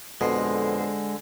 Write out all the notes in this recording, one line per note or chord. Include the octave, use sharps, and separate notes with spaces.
F2 B2 D3 G#3 C5